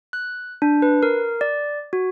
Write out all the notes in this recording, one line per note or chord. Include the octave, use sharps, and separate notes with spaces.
F#6
D4
B4
A#4
D5
F#4